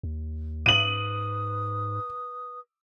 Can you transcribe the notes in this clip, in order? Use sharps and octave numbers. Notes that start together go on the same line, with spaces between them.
D#2
G#2 B4 D#6 D#7 F#7